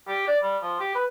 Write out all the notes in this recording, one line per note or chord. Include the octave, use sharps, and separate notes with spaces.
G4
D5
G3
F3
G4
B4